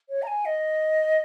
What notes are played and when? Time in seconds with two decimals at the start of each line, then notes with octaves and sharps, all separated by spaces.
0.10 C#5
0.22 A#5
0.27 G#5
0.45 D#5